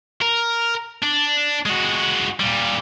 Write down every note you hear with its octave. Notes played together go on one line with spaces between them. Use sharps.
A#4
D4
G#3 F#4
A#2 G3